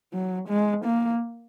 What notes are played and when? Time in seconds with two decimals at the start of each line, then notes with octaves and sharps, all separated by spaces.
0.13 F#3
0.48 G#3
0.85 A#3